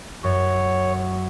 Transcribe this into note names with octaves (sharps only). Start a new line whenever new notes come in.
F#2 C#5